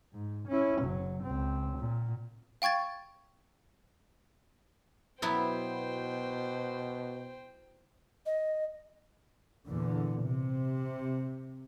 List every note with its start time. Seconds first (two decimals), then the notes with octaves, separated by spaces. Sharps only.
0.14 G#2
0.48 C#4 E4
0.82 F#1 F#3
1.23 C#2 C4
1.78 A#2
2.62 F5 G5 C#6 G#6 A6
5.22 B2 F#3 B3 E4 C5 G5
8.26 D#5
9.67 E2 A#2 D3
10.24 C3